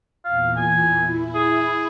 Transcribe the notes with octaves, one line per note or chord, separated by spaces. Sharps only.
E2 A#2 F5
G#5
E4
G#4